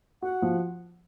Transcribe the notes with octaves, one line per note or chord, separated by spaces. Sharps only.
F#4 F#5
F3